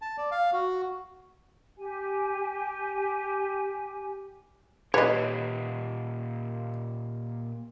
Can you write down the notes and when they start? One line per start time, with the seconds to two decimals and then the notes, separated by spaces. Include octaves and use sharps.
0.02 A5
0.18 D5
0.31 F5
0.53 F#4
1.78 G4 G#5
4.94 A#2 G4 B4 C#5 D#5